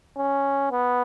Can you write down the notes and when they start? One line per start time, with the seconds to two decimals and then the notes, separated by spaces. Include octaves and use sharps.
0.18 C#4
0.71 B3